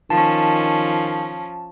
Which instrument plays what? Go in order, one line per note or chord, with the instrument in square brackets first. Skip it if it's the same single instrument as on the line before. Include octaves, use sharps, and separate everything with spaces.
[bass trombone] D#3 [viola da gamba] F3 C#4 [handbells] A5